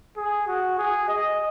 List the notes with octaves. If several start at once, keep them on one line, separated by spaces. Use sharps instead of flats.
G#4
F#4
G#4
D#5